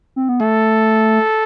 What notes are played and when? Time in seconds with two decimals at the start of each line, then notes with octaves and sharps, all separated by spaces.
0.16 C4
0.29 B3
0.40 A3 A4